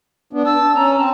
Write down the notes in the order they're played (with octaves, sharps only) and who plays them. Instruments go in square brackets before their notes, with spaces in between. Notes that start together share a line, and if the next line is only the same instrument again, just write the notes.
[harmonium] B3 D4
[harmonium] A5 [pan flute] E6
[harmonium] C#4 [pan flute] A#5
[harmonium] C4 [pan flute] A5